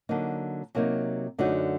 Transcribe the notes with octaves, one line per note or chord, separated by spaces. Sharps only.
D3 F#3 A#3 D#4
C3 F#3 A#3 D#4
F#2 D3 A3 D#4 F#4